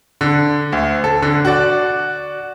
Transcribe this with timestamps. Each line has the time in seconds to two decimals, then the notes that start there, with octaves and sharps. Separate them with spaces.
0.21 D3
0.72 D2
1.04 A4
1.22 D3
1.45 F#4 D5